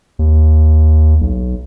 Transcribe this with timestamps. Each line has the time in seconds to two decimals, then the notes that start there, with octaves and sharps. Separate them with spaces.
0.19 D#2
1.21 B1